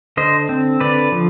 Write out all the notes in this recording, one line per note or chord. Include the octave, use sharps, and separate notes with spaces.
D3 C5 D#5
C4
D3 B4 D5
F3